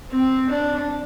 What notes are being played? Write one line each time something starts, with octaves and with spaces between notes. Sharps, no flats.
C4
D4